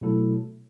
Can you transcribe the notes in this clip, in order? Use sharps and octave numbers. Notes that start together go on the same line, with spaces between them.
B2 F#3 A3 E4 A4